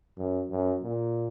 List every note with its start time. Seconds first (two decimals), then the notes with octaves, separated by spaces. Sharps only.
0.18 F#2
0.50 F#2
0.83 A#2